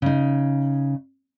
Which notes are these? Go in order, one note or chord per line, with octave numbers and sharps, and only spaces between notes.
C#3 D#4